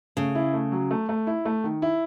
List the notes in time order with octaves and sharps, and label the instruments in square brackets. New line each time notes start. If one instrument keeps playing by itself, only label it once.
[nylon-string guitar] C#3 [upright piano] A3
[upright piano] E4
A3
F#3
A3
A3
E4
A3
D#3
E4